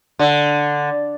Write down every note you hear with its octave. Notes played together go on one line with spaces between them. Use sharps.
D3